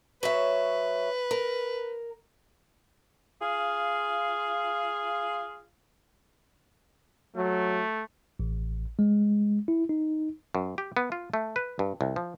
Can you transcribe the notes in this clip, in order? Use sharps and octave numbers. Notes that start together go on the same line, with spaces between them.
F#3 B4 C#5 E5
A#4
F4 G#4 F5
F#3 A3
A1
G#3
E4
D#4
F#2
G4
B3
F4
A3
B4
G2
C2
F3